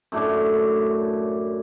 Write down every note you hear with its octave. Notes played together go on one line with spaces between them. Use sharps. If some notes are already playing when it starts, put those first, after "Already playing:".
F#2 A2 D4